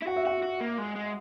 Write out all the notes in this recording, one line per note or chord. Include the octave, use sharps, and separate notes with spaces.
E4
F#4 F#5
E5
F#4 F#5
F#4
A#3
G#3
G#3